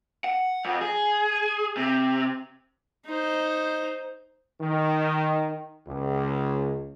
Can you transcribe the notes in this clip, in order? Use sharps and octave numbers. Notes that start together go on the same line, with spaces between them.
F#5
F2
G#4
C3
D#4 C5
D#3
C#2